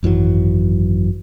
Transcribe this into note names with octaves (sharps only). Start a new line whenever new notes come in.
G#1 F#2 E3 F#3